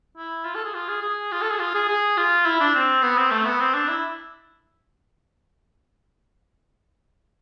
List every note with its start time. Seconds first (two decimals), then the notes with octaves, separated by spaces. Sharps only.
0.17 E4
0.45 F4
0.55 A4
0.65 G#4
0.75 F4
0.88 G#4
1.02 G#4
1.32 F4
1.42 A4
1.51 G#4
1.59 F4
1.75 G#4
1.89 G#4
2.17 F4
2.46 E4
2.60 D4
2.75 C4
3.03 B3
3.17 C4
3.31 A3
3.45 B3
3.60 C4
3.74 D4
3.88 E4